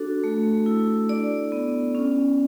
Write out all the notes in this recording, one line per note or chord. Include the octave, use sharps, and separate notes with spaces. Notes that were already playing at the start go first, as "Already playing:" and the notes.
Already playing: D4 F#4 A4
A3
E4
D4 D5
B3
C#4